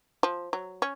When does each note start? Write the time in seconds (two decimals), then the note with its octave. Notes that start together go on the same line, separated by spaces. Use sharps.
0.23 F3
0.53 F#3
0.82 C#4